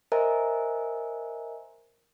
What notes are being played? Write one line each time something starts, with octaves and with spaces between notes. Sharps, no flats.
A#4 C5 D#5 E5 G#5 A#5